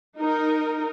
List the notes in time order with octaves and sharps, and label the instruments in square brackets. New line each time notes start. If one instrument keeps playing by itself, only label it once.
[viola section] D#4 A#4